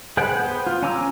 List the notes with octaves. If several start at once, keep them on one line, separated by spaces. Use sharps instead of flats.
G#4 B4 C5 F#5 G5
B3 C5
F4
C#4 G#5 A#5 D6 E6